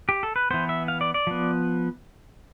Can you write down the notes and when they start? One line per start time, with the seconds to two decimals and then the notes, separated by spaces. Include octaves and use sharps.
0.09 G4
0.23 A4
0.36 B4
0.51 E3 B3 C5
0.69 E5
0.88 F5
1.01 D5
1.14 D5
1.27 F3 B3